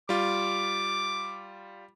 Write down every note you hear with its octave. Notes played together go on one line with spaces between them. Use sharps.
G3 F4 D6